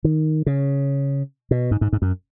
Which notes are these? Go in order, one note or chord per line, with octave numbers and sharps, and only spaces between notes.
D#3
C#3
B2
G#2
G#2
G#2
F#2